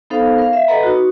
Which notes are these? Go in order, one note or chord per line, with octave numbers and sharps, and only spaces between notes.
B3 D#4 A4 C5 F5
A#4 F5
E5
A4 B4 D#5 F#5 A#5 B5
D#4 F#4